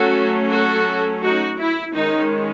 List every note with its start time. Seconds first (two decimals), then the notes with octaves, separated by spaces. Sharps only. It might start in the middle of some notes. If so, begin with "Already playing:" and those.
Already playing: F#3 A3 C#4 F#4 A4
0.50 F#4 A4
1.21 D#4 F#4
1.58 E4
1.94 D#3 G#3 C#4 D#4